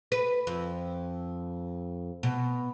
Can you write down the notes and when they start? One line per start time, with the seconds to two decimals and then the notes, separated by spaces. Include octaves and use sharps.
0.12 B4
0.47 F2
2.23 B2